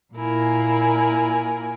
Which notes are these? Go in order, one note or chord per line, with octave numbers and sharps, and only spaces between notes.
A#2 E4 A#4 G#5